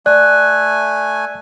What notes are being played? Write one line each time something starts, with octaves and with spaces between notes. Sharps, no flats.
A3 D5 G#5 F#6